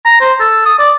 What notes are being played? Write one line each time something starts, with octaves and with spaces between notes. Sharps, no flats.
A#5
C5
A4
D#6
D5